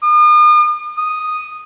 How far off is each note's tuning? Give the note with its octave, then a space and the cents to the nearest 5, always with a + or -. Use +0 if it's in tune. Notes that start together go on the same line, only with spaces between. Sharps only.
D#6 -40
D#6 -5